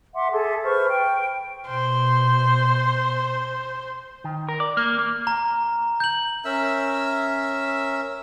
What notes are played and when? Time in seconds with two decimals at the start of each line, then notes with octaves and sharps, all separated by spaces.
0.15 E5 F#5 C6 D6
0.32 G#4 A4 E5
0.64 B4 C5 C#6 F6
0.87 G5
1.67 B2 C5
4.24 D#3
4.49 A#4
4.60 D5
4.77 A#3
4.99 A#3
5.27 A#5
6.00 G6 F#7
6.45 C#4 A#4 E5 E6